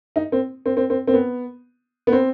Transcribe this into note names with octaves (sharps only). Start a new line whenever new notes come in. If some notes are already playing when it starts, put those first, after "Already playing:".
D#4
C4
C4
C4
C4
C4
B3
B3
C4